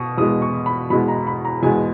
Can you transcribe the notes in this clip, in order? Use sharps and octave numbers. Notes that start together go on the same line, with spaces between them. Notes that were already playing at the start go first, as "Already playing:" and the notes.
Already playing: B2 C#6 D#6
E2 B2 G#3 B3 D#6
C#6
B5
E2 B2 G#3 B3 B5
A#5
B5
A#5
E2 B2 G#3 B3 G#5